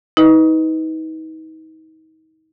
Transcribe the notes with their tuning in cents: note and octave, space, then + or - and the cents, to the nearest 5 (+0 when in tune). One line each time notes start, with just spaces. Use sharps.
D#4 +35 B4 +0 D#5 +0